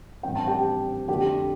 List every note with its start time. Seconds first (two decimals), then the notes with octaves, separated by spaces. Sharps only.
0.23 A1 G2 F3 C4 G5
0.35 A5
0.47 G4 G5
1.08 F2 D3 A3 D4 G4 G5